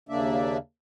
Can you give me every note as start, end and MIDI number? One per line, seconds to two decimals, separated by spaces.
0.09 0.57 39
0.09 0.57 49
0.09 0.57 58
0.09 0.57 62
0.09 0.57 74
0.09 0.57 76